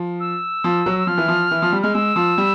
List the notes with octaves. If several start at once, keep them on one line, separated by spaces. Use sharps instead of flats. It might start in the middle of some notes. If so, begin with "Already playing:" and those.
Already playing: F3
E6
F3
F#3
F3 F6
E3
F3
E3
F3
G3
G#3 F6
G#3 E6
F3
G3